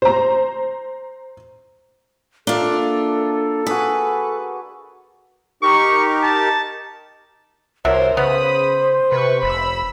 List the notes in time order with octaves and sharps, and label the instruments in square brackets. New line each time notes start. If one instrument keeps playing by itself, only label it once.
[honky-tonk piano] C5 A#5
[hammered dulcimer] A#3 D5 E5 [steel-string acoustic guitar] D4 F4 [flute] A4
[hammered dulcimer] F#4 G#4 [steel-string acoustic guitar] B4
[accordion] D#4 G4 A#4 [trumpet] C#6
[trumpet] A5
[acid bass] C2 [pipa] D4 F#4 E5 [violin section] A#4 C5 [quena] C#5
[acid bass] C#3 [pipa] B3 [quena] C5 [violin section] B5 D#6
[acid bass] C3 [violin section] B4 C#6
[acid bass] F1 [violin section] B5 E6